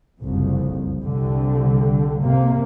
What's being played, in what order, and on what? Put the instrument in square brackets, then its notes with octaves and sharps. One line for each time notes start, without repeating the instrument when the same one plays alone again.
[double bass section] F#1 C2 F2
C2 D3 G3
C3 A#3